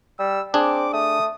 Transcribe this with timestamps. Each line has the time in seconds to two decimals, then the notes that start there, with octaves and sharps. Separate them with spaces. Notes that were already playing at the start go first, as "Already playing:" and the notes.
0.19 G3 E6
0.54 C4 D4 G#4 D6
0.93 A3 D#6